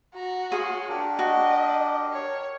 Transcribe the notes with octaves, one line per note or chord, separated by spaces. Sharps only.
F#4 A#5
G#4 C#5 F5 C6
D4 G4 A#4
F#4 D#5
C#5